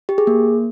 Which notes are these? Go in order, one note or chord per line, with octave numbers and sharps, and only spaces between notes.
G4
G#4
A#3